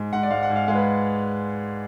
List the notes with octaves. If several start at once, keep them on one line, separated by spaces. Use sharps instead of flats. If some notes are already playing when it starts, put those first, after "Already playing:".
Already playing: G#2
G#2 F#5
D5
G#2 F5
F#5
G#2
F5
G#3 F5
B4